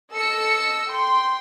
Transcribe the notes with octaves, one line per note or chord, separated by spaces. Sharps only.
A4 D#5 E6 C#7
G5 C6